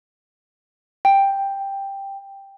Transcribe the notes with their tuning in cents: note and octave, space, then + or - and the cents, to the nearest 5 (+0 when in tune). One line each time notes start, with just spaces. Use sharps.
G5 +5